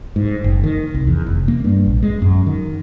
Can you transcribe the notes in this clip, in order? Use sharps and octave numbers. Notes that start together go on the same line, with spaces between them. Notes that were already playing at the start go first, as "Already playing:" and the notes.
G#2
F#1
D#3
C2
E2
F1
A#3
G2
A#1
G#3
F#2
D#3